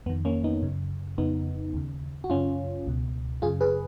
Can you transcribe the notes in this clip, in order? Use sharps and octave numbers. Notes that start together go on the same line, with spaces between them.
F2 D#3 B3
A#3 C#4
B3 D#4
F#2 C#3
F2 C#3 B3 D#4
D#2 C#3
F#4
F#2 C#3 C#4 F4
C#2 B2
F#2 C#3 F4 G#4
G#4 B4